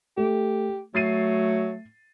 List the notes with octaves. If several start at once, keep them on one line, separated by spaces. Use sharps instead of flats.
A3 G4
F#3 A3 A6 C7 D#7